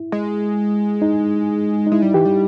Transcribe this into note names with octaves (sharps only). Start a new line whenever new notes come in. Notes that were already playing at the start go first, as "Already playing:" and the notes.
Already playing: E4
G#3
D#4
D#4
G#3 E4
G3
E3 G4
G3